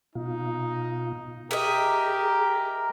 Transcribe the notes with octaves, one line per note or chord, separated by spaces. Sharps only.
B2 D#4 F4
G4 G#4 A#4 D#5 E5 A#5